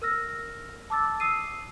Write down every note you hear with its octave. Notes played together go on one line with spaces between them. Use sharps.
A#4 E6 F6 A#6
A5 D6 E6 A6
D#6 E6 C7 D#7